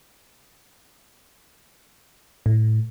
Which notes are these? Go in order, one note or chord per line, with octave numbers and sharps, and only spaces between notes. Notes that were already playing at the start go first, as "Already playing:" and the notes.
A2